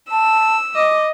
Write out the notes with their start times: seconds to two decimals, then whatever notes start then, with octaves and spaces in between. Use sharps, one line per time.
0.11 A5 E6
0.75 D#5 D6